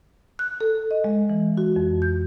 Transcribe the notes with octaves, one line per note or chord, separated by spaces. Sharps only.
F#6
A4
D#5
G#3
E3
F#4
F2
G6